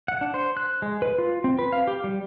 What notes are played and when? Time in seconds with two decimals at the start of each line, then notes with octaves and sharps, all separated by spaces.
0.08 F#5
0.21 D4
0.34 C5
0.57 F#6
0.82 G#3
1.02 B4
1.18 F4
1.44 C4
1.59 B4
1.72 F5
1.87 G4
2.04 G3